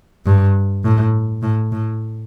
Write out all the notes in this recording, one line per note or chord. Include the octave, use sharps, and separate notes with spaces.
G2
A2
A2
A2